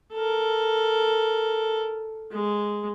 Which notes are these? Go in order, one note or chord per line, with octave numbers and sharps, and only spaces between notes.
A4 A#4
G#3